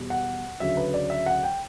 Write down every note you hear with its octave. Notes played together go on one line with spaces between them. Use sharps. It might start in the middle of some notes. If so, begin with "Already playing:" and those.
Already playing: E2 B2 G3
F#5
D2 C#3 F#3 E5
B4
D5
E5
F#5
G5